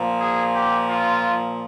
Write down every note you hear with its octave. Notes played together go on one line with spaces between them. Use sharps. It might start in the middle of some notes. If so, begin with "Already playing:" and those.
Already playing: A#2 F3
G#4
G4
F4